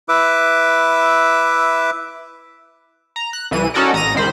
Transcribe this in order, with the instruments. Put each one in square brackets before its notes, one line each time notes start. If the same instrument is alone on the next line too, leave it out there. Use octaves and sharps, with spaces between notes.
[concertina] E4 B4 E5 D6
[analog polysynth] A#5
F#6
C2 E3 D#7
C#4 D#4 F#4 A4 A#4 D5
A1 A#5 D#6 A#6 D#7
C#2 D#3 C5 B5